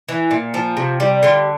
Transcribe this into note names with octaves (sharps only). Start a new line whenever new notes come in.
E3
A#2
F3
C3
G3
D3 F4